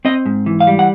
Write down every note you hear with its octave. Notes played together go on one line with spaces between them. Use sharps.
C4 D#5
G#2
E3
F5
G3
F#5